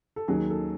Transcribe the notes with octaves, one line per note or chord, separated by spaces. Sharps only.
A4
D#2 D#3 F#3 G#4
A4